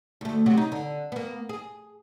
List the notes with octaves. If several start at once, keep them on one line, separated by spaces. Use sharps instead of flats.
D2 A3
C3 F#3 F#4
D#4
D3
A#3 B3
G#4